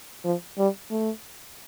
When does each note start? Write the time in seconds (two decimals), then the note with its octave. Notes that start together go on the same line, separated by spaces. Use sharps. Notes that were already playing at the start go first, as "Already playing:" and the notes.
0.24 F3
0.58 G3
0.90 A3